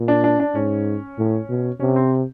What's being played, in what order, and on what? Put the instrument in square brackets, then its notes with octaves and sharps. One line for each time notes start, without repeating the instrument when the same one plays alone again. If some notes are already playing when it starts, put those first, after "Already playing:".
Already playing: [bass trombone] A#2
[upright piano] D4
D4
D4
[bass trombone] G#2 [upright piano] C#4
[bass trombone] A2
B2
[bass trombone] C3 [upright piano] C#4
[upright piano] C4